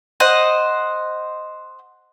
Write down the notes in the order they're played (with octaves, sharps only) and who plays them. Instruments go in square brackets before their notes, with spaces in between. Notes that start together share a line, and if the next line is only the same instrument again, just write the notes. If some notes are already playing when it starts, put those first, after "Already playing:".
[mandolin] C5 D#5 F#5